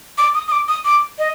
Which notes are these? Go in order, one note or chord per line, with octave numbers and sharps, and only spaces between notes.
D6
D#6
D#6
D6
D#6
D6
D#5